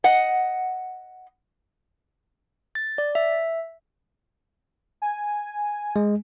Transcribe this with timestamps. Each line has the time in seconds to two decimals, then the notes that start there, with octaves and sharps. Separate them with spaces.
0.04 D#5 F#5
2.75 A6
2.98 D5
3.15 E5
5.02 G#5
5.96 G#3